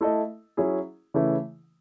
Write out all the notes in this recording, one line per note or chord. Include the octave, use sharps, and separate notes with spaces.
A3 E4 A4 D#5
F#3 C#4 E4 G#4
C#3 E3 A3 E4